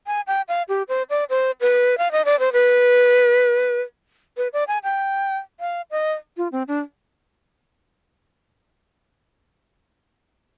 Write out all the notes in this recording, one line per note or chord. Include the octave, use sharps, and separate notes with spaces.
G#5
G5
F5
G4
C5
D5
C5
B4
F5
D#5
D5
C5
B4
B4
D5
G#5
G5
F5
D#5
F4
C4
D4